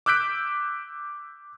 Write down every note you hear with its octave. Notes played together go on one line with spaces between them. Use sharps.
D6 E6 F#6 G6 B6 D7